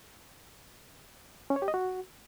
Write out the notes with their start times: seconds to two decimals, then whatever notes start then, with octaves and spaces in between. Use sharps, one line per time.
1.50 C#4
1.56 C#5
1.62 G4
1.68 D#5
1.74 F#4